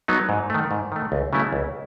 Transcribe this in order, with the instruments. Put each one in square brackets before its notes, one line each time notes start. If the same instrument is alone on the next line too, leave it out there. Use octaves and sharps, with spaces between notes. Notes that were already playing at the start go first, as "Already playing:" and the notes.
[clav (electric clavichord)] F#3 B3 D#4
G#2
D#3 A3
G#2
D#3 A3
C#2
C#3 F#3 A3 E4
C#2